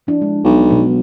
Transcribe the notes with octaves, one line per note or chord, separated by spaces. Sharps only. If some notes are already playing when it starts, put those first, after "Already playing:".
F3 D4 E4
G#3
B1
B2 F#3 B3